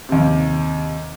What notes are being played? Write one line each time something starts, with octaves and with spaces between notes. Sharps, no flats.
D#2 C3